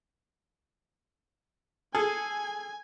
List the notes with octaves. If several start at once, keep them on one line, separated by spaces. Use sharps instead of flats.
G#4 A4 G#5